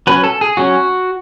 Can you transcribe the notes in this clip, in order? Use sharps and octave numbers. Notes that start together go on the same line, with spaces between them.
F#3 C#4 B4
A4
G#4
F#3 C#4 F#4